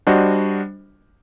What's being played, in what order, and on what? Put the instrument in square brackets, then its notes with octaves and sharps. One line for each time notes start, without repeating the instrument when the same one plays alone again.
[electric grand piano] G3 D4 F#4 C5 D#5